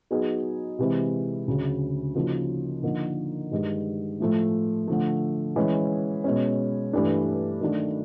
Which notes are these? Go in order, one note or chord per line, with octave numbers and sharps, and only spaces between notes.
F#3 B3 D#4 G#4
C3 E3 G#3 C4
D2 C#3 F#3
C#3 F3 A#3 D#4 F#4
D3 F3 A#3 D#4
G2 D#3 G#3
A2 F3 A3
D3 F3 A3
E3 G#3 C#4
B2 G#3 C#4
G2 E3 A3 D4
D#3 F#3 A3 D4 F#4